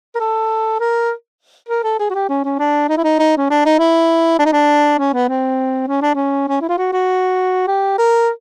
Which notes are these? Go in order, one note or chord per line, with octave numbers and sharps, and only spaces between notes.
A#4
A4
A#4
A#4
A4
G#4
F#4
G4
C#4
C#4
D4
D#4
E4
D#4
D#4
C#4
D4
D#4
E4
D4
D#4
D4
C#4
B3
C4
C#4
D4
C#4
C#4
E4
F4
F#4
F#4
G4
A#4